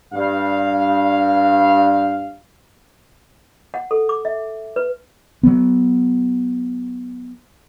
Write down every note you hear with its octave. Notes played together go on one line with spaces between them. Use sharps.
G2 F5
F#5
A4
D6
E5
B4
F#3 B3